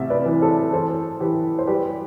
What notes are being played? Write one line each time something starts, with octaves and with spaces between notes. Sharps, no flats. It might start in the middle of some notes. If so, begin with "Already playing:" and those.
Already playing: A1 C3 E5
B4 D5
E3
A4 C5
E3 A4 C5
E3 G4 B4
C5
G3 G4 B4